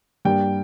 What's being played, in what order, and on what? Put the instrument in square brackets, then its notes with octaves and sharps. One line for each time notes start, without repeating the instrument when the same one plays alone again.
[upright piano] G2 G3 A#3 G5